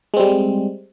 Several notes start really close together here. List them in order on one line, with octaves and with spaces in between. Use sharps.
G#3 C4 G3